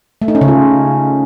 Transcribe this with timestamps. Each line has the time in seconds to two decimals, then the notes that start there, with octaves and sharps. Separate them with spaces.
0.22 A3
0.28 D#4
0.35 C#4
0.41 C#3
0.48 F4